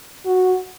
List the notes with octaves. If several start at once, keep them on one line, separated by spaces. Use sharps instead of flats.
F#4